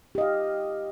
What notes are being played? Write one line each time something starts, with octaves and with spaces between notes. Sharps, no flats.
G4 D#5 F5